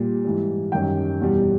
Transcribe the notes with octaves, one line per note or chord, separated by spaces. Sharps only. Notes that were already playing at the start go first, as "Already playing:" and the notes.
Already playing: A#2 G3
G#2 E3 G3
F#2 D#3 G3 G5
E2 B2 G3